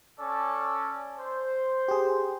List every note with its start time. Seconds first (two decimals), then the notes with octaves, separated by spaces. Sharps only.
0.19 C#4 A4 D5
1.19 C5
1.88 G4 G#4